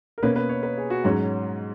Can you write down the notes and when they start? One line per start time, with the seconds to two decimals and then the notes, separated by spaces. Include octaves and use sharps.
0.18 A#4
0.22 B2 A#3 C#4 B4
0.36 B4
0.49 C#5
0.63 B4
0.77 G#4
0.90 F#4
1.04 G#2 F#3 C#4